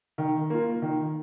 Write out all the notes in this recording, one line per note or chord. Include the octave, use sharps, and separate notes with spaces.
D#3
A#3 F4
D#3